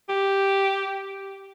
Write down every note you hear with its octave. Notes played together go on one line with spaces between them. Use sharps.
G4